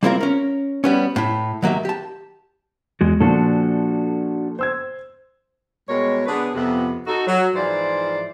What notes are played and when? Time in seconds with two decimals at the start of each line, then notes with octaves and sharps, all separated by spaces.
0.03 G3 A#3 C4 E4 F4 A#4
0.20 C#4 A#4
0.84 G3 B3 C#4
1.16 A2 E4
1.62 D#3 F#3 A#3 G4 E5
1.85 G4 A5
3.01 E2 G#3 F#4
3.21 A#2 F3 D4 F#4 A4
4.59 C5 E6 G#6
5.88 B2 G3 G#3 A#4 C#5
6.26 D3 B3 G#4 B4
6.55 F2 C3 B3
7.07 D#4 F#4 A4
7.27 F#3
7.56 G#2 E3 F3 E4 C5 D5